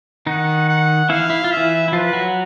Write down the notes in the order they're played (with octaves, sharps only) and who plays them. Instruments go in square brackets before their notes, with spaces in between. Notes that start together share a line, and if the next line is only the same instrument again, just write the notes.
[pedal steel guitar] D#3 D#4 [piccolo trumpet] F#5
[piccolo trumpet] F#5
[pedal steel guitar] E3 E4 [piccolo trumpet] F5
[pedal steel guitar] E4
F4
[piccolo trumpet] E5
[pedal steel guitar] E3 E4
E4
[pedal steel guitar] F3 F4 [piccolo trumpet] B4
[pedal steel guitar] F#3 F#4